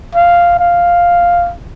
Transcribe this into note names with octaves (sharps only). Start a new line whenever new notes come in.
F5
F5